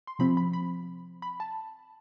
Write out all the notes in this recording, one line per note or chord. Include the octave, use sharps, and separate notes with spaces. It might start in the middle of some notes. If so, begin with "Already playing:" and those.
C6
C3 F3 C4 B5
B5
B5
B5
A5